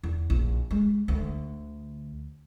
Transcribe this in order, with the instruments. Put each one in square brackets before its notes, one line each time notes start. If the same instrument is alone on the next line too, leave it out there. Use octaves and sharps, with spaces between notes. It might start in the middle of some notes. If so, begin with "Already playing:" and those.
[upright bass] E2
A#1
G#3
D2